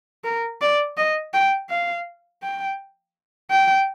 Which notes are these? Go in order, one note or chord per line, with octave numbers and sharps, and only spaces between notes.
A#4
D5
D#5
G5
F5
G5
G5